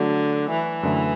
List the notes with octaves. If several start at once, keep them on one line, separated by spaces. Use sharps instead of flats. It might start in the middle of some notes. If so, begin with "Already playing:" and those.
Already playing: D3 F#3 A3 D4 F#4
E3
F#2 D3 A3